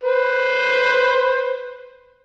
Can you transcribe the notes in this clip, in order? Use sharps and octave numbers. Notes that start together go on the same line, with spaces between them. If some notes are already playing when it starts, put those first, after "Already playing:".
B4 C5